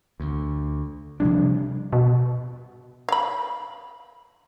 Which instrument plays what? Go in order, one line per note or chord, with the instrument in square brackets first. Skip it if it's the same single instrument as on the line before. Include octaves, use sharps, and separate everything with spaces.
[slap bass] D2
C3 F3 G3 D4
[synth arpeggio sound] B2
[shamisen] F5 B5